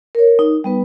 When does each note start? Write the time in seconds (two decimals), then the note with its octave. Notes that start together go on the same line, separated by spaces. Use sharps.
0.15 A#4 C#5
0.39 D#4
0.64 G3 B3 B4